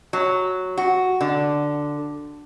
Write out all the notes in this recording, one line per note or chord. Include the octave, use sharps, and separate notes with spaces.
F#3
F#4
D3